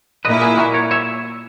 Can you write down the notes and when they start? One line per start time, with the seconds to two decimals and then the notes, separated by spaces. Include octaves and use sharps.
0.25 A#2 A#3 E4 B4 D#5
0.41 G#4 B4
0.58 F#4 A#4
0.74 A#4 C#5
0.91 C#5 E5